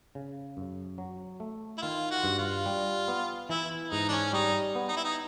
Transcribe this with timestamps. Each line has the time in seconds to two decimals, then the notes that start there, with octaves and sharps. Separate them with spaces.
0.15 C#3
0.57 F#2
0.98 F#3
1.40 A3
1.78 E4
1.82 D#3 F4
2.11 F#4
2.24 G2
2.38 F4
2.66 G3
3.08 B3
3.49 E3 E4
3.91 G#2 D#4
4.09 D4
4.12 C#4
4.33 G3 D#4
4.75 B3
4.89 D#4
4.97 E4
5.04 D#4